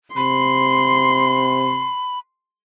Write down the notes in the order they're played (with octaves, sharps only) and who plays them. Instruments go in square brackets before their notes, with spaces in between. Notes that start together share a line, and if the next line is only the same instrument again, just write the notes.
[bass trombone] C3 [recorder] B5 [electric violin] C6